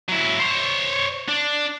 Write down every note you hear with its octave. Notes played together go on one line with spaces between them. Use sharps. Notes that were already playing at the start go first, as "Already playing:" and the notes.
F#3 E4
C5 C#5
D4